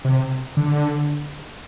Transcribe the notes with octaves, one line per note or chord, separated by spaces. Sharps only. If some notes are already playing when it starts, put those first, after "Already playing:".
C3
D3